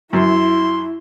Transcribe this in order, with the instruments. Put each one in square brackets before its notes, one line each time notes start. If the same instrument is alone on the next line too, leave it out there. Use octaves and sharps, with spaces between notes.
[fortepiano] F#2 [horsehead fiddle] E4 [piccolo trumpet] C6